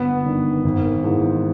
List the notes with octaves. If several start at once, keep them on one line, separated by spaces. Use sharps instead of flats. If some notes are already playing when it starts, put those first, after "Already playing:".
Already playing: G1 B3
G2 D#3
G#1
G#2 E3